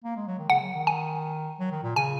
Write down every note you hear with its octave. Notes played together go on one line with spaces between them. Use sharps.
A#3
G#3
F#3
D#3
C#3 F#5
F#3
D#3
G#5
F#3
D#3
A#2
C#3 G#5